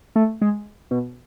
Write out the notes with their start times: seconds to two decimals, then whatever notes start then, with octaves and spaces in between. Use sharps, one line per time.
0.16 A3
0.41 G#3
0.91 B2